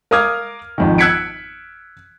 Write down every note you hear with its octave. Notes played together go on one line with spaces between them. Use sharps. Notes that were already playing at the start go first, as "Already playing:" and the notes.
A#4 F5 D6 D#6 F6 G#6
G#1 F2 D#3
E6 F#6 G#6 B6 C#7 D7